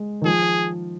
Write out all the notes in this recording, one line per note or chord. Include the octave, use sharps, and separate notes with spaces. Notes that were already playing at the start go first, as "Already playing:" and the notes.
Already playing: G#3
D#3
F3 G#4